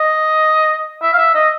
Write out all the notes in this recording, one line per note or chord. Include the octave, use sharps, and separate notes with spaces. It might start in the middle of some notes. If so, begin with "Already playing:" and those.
Already playing: D#5
E5
F5
E5
D#5